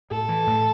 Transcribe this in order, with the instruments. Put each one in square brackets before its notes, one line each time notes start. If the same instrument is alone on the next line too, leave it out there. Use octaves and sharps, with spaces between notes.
[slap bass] A2 [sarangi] A4
[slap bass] E3
A2